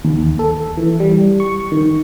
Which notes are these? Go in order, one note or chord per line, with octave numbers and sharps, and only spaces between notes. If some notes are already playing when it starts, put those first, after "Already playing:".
D#2
A4
E3
G3
C#6
D#3